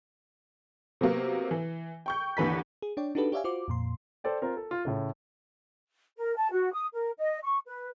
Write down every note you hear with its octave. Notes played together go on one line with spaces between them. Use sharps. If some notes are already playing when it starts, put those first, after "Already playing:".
C3 F#3 A#3 B3
E3
G5 C#6 G6
D#2 D3 E3 B4 B6
G#4
D4 C#5 D5 G5
D4 D#4 F#4 G4 A4 B4
G4 C#5 D5 E5 F5 G#5
F4 F#4 C5 D6
F2 A#2 C6
A4 C5 D5 G5
C4 F4 A#4
A4
F4
A2 C#3 A3
A#4
A5
F#4
D#6
A#4
D#5
C#6
B4